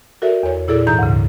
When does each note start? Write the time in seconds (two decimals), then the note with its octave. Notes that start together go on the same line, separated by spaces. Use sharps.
0.22 F#4 A4 A#4 D5 E5
0.43 E2 C#5
0.68 A#2 E4 G#4 A4 D5 E6
0.87 G#2 E3 D#4 A#5 G6
0.99 D2 G#2 C#3